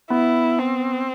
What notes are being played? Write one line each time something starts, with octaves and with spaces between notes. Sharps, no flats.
B3 E4
C4